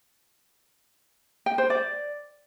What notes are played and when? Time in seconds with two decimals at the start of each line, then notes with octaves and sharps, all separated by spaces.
1.46 G5
1.58 C5
1.70 D5